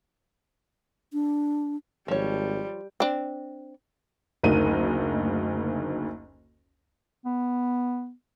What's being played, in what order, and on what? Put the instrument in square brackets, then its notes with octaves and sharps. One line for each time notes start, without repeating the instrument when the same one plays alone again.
[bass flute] D4
[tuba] G#1 [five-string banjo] F3 C#5 [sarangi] G3
[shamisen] C4 D4
[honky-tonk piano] F#1 D2 A#3 D#4 D#7
[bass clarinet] B3